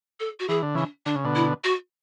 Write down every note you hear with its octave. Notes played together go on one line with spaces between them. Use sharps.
A4
F#4
E3 G#4
D3
C#3 E3 D4
D3 D4
C#3
B2 D3
E4
F#4